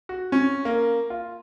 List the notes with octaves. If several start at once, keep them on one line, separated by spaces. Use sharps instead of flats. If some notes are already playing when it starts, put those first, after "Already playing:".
F#4
C#4
A#3
F4